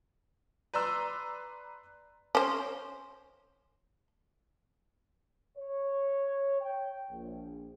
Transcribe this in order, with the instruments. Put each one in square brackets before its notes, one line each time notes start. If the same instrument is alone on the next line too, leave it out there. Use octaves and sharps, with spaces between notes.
[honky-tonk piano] B4 D5 A#5 C6 E6
[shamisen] C#4 C5
[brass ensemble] C#5
G5
A#1